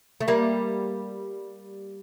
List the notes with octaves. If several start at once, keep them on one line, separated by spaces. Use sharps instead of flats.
A3
G3 A#3